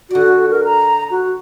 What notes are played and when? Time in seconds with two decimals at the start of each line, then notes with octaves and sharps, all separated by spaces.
0.10 D3 F#4 D5
0.51 A#4
0.65 A#5
1.11 F#4